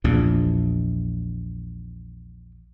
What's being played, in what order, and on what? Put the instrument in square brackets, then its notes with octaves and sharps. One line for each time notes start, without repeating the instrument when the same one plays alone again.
[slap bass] A#1 E2 A#2